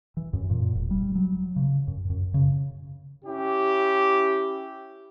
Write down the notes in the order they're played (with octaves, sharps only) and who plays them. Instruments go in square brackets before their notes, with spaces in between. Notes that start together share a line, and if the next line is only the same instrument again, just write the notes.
[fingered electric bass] E3
F#2
A#2
E1
G3
F#3
C#3
F#2
F#2
C#3
[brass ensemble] C#4 E4 G4